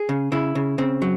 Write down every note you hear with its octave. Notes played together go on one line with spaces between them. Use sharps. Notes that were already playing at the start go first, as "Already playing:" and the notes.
Already playing: G#4
C#3
C#3 E4
C#3
C#3 C4
F#3